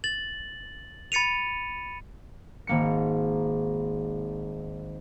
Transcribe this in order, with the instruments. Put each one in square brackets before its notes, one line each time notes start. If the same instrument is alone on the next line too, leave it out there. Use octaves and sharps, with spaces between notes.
[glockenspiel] A6 F#7
B5 A6 C#7 D#7 F7
[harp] G#1 A#3 C#7